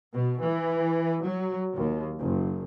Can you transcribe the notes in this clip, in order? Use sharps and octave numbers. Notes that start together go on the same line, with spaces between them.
B2
E3
F#3
D#2
F#1